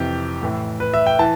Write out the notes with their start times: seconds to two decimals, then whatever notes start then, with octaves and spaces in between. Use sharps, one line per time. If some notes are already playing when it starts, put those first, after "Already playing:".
Already playing: F2 C3 E3 G4
0.42 A2 E3
0.80 B4
0.94 E5
1.06 G5
1.19 E3 A5